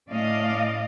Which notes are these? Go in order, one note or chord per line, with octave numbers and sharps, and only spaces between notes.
A2 C#4 D5 D#5 F5